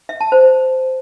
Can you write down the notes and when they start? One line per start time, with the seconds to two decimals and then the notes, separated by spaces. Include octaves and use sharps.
0.09 E5
0.21 A5
0.32 C5